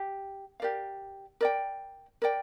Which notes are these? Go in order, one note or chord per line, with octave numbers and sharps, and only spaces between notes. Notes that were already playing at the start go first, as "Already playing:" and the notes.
Already playing: G4
G4 A#4 D5 F5
A#4 D5 G5
A#4 D5 G5